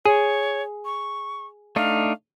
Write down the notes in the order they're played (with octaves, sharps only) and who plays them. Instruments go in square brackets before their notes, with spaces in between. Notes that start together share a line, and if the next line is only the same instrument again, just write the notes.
[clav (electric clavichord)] G#4 [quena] C#5
[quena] C#6
[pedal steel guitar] A3 D4 D#4 [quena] F5